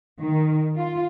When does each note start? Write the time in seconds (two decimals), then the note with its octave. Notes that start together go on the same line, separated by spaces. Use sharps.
0.22 D#3
0.76 F4